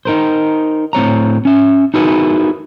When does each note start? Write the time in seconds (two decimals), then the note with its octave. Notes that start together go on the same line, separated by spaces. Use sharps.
0.05 D#4 A#4 C5
0.93 A2 C4 C#5 A#5
1.45 C#4 E5
1.94 D#4 E4 F#4 G#4 A#4 B4